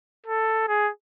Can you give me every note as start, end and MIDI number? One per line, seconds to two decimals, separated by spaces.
0.27 0.68 69
0.68 0.90 68